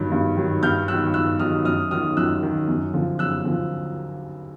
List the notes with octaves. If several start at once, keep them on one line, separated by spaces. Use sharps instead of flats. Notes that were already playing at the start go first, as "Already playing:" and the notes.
Already playing: G2 D#3 F#3
G2
D#3 F#3
G2 F6 G6
D#3 F#3 E6 F#6
G2 E6 F#6
D#3 F#3 D#6 F6
F#2 D#6 F6
D#3 F#3 D#6 F6
F#2 E6 F#6
D#3 F#3
F#2
D3 F3
F#2 E6 F#6
D3 F3